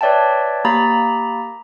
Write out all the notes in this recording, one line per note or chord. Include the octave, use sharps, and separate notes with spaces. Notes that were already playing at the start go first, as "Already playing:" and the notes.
B4 C#5 D5 E5 G5 A5
A#3 G4 A#5 B5 A6